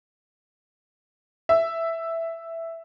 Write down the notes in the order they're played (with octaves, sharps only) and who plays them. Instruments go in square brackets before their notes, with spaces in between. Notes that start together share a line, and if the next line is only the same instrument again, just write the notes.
[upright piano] E5